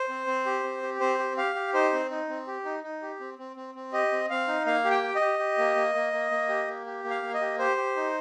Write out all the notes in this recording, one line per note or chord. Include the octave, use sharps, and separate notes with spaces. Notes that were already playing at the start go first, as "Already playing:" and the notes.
Already playing: C5
C4
C4
G4
C4
G4
C4 C5
G4
G4 F5
G4
D#4 C5
C4
D#4
C4
G4
D#4
D#4
G4
C4
C4
C4
C4
G4 D#5
C4
C4 F5
D#4
A#3 F5
G4
G5
G4
D#5
G4
G4
A#3
A#3
A#3
A#3
A#3
G4
A#3
G4
A#3
F5
A#3
D#5
G4
G4 C5
G4
D#4